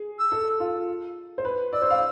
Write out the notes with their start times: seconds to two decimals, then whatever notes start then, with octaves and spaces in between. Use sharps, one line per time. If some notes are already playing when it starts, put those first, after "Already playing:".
Already playing: G#4
0.18 E6
0.32 A4
0.60 F4
1.38 C5
1.45 B4
1.73 D5 E6
1.82 C5
1.90 F5